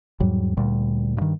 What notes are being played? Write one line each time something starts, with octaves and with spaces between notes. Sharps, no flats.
E2 G#2 F#3 G3
D2 A#2 G3
G2 D#3